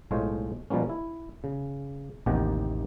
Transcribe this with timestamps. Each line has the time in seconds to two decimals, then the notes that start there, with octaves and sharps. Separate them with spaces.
0.11 B1 A2 G#3 F4 C5 C#5
0.70 B2 F3 G3 A#3 C#4
0.89 E4
1.44 C#3
2.26 A1 D#2 C3 D#3 G4 F#5